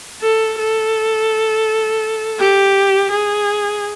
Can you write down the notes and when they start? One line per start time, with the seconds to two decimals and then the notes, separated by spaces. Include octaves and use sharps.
0.22 A4
0.59 A4
2.40 G4
3.11 G#4